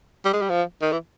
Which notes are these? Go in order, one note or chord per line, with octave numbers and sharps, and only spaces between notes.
G3
G#3
G3
F3
D#3
E3